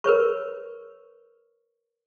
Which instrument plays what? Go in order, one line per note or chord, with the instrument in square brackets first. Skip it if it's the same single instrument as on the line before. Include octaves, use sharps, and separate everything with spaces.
[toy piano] A#4 B4 C#5 C#6